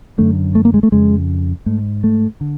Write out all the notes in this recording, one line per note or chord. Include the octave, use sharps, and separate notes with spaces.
F#2 D3 A3
A3
A#3
G#3
A3
F2 C#3 G#3
G#2 A3
A3
D3